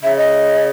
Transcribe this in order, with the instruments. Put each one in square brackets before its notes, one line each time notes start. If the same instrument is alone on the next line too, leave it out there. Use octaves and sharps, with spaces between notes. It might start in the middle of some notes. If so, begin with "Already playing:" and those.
[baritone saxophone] C#3 [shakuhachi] E5
[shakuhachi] D#5